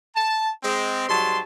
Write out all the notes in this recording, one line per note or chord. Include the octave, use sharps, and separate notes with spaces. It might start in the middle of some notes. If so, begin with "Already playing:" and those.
A5
G#3 C4
G#2 F#3 G3 A5 C6